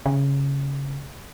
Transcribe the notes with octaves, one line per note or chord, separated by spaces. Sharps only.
C#3